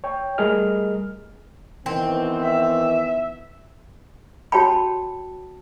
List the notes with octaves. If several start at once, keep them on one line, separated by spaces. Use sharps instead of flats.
C#5 G5
G3 A3 G#4 A#4 D#5 F6
D#3 E3 B3 C4
E5
F#4 C#5 G5 A5 B5